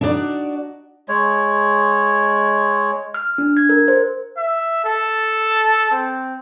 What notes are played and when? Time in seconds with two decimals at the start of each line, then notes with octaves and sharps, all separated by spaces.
0.01 D4 D#4 F#4 B4 D5
1.08 G#3 C#5
3.14 F6
3.38 D4
3.57 G#6
3.69 A#4
3.88 C5
4.37 E5
4.84 A4
5.91 C4